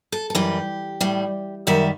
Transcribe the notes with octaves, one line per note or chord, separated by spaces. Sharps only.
A4
A4
F#2 E3 G3 G4
A2 G3
F#2 D#3 G3 E5